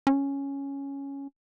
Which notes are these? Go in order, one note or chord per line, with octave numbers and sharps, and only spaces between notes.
C#4